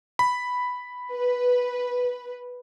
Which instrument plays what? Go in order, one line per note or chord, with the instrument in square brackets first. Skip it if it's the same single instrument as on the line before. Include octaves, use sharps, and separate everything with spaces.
[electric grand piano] B5
[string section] B4